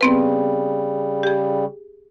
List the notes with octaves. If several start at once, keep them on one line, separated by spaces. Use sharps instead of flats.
C#3 G3 B3 C4 B4
G4 G#4